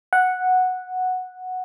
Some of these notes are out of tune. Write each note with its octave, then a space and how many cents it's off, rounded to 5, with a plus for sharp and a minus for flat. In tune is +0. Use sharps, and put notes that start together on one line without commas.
F#5 -5